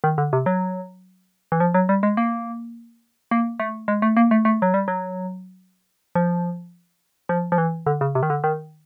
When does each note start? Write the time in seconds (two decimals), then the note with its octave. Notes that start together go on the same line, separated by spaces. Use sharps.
0.04 D#3
0.18 D3
0.33 C3
0.46 F#3
1.52 E3
1.60 F3
1.74 F#3
1.89 G3
2.03 G#3
2.17 A#3
3.31 A#3
3.60 A3
3.88 G#3
4.02 A3
4.17 A#3
4.31 A3
4.45 A3
4.62 F#3
4.74 G3
4.88 F#3
6.15 F3
7.29 F3
7.52 F3
7.58 E3
7.87 D3
8.01 C#3
8.15 C3
8.23 D#3
8.30 D3
8.44 D#3